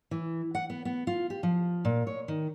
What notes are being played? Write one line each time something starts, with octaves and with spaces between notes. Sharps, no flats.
E3
F#5
B3
B3
F4
G4
F3
A#2
C#5
D#3